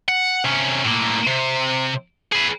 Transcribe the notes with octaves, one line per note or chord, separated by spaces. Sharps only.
F#5
C3 C#4
A2 A#3
C3
G#4 B4